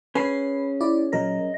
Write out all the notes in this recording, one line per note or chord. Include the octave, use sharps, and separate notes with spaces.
C#4 G#4 B4 C7
E4 D5
A#2 F#3 A#4 D#5